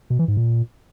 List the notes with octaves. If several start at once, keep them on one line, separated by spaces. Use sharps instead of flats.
B2
E3
G#2
A#2